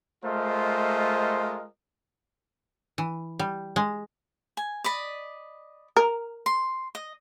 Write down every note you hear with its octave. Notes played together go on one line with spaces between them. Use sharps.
G#3 A3 F4 A#4 C5 D#5
E3
G3
G#3
G#5
D5 D#5 B5
A#4
C6
D#5